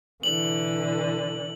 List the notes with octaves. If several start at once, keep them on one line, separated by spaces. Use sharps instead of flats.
B2 D3 E3 F#7